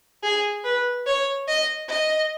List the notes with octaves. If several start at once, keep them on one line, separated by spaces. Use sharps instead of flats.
G#4
B4
C#5
D#5
D#5